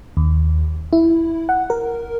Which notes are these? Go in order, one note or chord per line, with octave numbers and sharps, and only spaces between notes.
D#2
E4
F#5
A#4